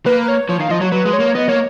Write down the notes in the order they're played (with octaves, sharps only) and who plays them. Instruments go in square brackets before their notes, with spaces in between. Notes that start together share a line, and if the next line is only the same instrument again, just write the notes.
[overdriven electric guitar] A#3 [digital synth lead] B4
[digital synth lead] B4
C#5
[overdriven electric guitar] F3 [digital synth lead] C#5
[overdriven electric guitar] D#3 [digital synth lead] F5
[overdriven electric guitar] F3 [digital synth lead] D#5
[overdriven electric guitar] F#3 [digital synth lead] C#5
[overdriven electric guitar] F#3 [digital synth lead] B4
[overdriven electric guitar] G#3
[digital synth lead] C#5
[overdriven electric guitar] A#3
[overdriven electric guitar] B3 [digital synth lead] D#5
[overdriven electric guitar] A#3 [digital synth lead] C#5